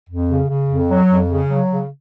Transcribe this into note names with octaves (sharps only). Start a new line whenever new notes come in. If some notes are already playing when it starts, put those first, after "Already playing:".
F2
C#3
C#3
F2
F#3
F2
C#3
F#3
C#3